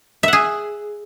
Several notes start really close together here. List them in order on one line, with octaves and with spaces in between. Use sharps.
E5 F#5 G#4